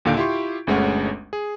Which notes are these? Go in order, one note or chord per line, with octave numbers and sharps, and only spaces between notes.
D#2 A#2 D3 F5 G6 D7
E4 F4 G4 C6 C#6
G1 D2 G#3 A3 C#4 F#5
G#4